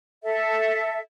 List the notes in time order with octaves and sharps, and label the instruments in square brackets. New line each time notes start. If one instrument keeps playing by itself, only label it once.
[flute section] A4 E5